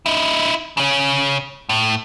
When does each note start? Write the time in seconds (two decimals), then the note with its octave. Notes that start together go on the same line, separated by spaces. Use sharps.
0.06 D#4 E4
0.77 C#3 C#4
1.69 A2